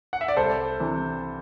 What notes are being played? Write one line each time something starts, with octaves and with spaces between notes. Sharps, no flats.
F#5
E5
D5
C2 A4 C5
C3 E3